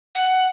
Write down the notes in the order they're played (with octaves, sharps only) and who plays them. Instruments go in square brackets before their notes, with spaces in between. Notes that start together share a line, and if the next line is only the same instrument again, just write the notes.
[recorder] F#5